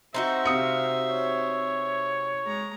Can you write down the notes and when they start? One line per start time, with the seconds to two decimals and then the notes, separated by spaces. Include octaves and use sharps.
0.14 C4 D#4 F#4 C5 E5
0.45 C3 F5 D#6 C#7
1.10 C#5
2.45 G#3 A#5